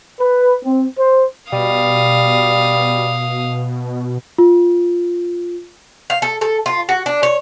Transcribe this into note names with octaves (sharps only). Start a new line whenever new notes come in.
B4
C4
C5
B2 G3 F5 D#6
F4
F5
A4
A4
F4
F#4
D4
C#5